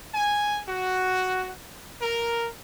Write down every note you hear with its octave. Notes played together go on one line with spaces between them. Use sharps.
G#5
F#4
A#4